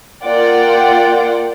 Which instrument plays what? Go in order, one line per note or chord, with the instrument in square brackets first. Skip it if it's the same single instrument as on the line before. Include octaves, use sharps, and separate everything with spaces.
[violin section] A#3 F4 D5 F#5 G5